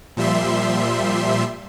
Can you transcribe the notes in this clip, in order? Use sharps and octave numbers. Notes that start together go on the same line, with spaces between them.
A#2 F3 G3 E5 C6